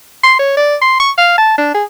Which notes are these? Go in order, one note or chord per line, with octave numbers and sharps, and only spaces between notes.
C6
C#5
D5
C6
C#6
F5
A5
D4
G#4